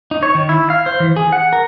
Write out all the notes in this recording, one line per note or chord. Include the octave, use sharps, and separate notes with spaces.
D#4
C#5
D#3
E4
F5
C5
E3
G#4
F#5
A#4